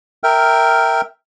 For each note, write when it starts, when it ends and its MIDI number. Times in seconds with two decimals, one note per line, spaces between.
0.24 1.01 70
0.24 1.01 76
0.24 1.01 79
0.24 1.01 89